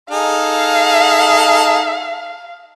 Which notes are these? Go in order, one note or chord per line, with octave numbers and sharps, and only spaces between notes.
D#4 G#4 A4 F5